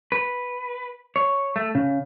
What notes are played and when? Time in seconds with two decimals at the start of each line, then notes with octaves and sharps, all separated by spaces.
0.12 B4
1.16 C#5
1.56 A3
1.75 C#3